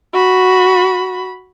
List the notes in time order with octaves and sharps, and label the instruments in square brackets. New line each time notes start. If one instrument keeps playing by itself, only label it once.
[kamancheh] F#4 B5